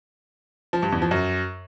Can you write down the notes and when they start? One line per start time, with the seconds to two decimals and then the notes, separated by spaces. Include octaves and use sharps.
0.73 F3
0.83 G2
0.92 E2
1.02 F3
1.11 F#2